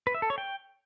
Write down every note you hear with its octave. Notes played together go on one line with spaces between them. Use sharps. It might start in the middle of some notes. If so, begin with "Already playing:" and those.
B4
E5
A4
C#5
G5